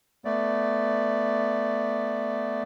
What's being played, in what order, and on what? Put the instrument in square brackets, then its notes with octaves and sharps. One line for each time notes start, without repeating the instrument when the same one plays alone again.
[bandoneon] A3 B3 D5